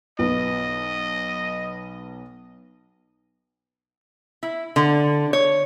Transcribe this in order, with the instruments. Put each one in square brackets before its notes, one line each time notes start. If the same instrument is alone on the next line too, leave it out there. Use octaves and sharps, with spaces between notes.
[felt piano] B1 B3 [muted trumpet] D#5
[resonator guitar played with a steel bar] E4
D3
C#5